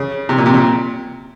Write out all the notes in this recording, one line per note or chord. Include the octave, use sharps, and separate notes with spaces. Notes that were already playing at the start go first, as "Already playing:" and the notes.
Already playing: C#3
C3
A#2
C3
A#2